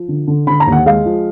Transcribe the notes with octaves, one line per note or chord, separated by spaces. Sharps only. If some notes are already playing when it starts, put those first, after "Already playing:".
Already playing: F3
D3
D3
D3 B5
A#5
D#2
F#5
G#3 F5
F3